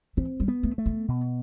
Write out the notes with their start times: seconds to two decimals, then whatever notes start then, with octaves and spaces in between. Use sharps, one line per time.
0.17 E3 C4
0.40 G3
0.48 B3
0.63 A3
0.78 A3
0.86 B3
1.08 B2